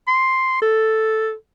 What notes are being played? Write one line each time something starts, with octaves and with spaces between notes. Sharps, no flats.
C6
A4